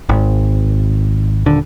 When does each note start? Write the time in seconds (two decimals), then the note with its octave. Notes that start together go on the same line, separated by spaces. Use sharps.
0.09 G#1
1.46 D#1 D3